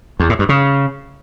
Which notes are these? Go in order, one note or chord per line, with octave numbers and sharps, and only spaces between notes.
E2
A2
G2
C#3